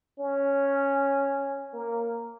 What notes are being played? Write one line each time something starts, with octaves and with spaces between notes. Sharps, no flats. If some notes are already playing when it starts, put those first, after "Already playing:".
C#4
A#3